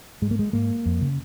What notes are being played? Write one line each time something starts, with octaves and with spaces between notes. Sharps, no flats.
G#2 G#3
A#3
G#3
G#2 A#3
F2
C#3